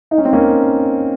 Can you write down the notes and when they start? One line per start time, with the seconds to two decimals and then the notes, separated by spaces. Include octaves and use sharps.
0.11 D#4
0.18 C#4
0.25 C4
0.33 A#3 C#4